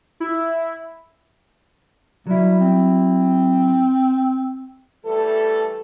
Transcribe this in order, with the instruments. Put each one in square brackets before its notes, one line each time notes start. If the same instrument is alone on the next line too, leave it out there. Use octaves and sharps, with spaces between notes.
[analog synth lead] E4
[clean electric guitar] F#3 E4 [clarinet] G3
[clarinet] C4
[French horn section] E3 G3 A3 A4